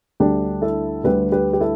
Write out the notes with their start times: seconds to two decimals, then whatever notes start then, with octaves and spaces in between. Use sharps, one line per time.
0.20 D2 D3 G3 D4 G4
0.62 E4 A4
1.04 D2 D3 G3 G4 B4
1.32 G4 B4
1.53 G4
1.60 E4 A4